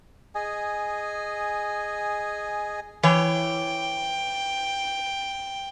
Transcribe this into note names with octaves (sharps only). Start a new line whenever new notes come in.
G#4 D#5 G#5
E3 C#5 G5